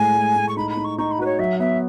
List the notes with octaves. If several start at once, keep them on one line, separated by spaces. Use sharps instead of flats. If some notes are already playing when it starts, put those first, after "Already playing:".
Already playing: A2 G#3 G#5
G#3
A2
C#6
D#4 B5
B5
D#4
C#6
D#4 C#6
B5
F#4 B4
C#5
F#3 E5
B3 E5